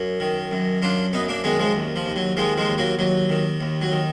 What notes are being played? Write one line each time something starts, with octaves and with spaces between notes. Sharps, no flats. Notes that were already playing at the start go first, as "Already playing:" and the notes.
Already playing: F#2
D#3
F#2
F#2 D4 F4
F#2 B3 D#4
A#3 D4
D#3 G#3 B3
F3 G#3
D#2
F3
D#2
F#3
D#3 F3 G#3
F3 G#3
D#2
F#3 A#3
D#2 F#3
D#3
D#2
F#3
D#3